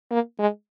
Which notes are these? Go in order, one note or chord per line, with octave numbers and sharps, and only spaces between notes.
A#3
G#3